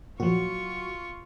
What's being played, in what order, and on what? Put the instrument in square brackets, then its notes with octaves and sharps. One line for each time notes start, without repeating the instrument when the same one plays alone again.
[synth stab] A#2 F3 [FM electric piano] F#3 F#4 [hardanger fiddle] F4 C#6